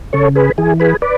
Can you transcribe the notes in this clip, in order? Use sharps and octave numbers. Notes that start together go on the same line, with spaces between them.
C#3 A4 C#5
G#4 B4
E3 G#4
G#4 B4
B4 D5